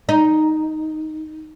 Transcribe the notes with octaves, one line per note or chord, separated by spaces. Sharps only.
D#4